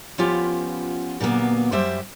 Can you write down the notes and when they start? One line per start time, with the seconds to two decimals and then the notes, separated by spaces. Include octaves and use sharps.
0.18 F3 B3 C#4 F4 G4
1.20 A#2 D3 F#3 A#3 B3
1.72 F#2 G3 G4 C5 E5